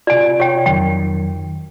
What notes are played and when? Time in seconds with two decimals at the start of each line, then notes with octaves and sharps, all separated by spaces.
0.07 C3 F4 D5 G#5
0.40 C#5 G5
0.66 F2 D#3 F#3 G5